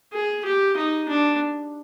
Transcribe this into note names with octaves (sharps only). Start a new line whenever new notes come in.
G#4
G4
D#4
D4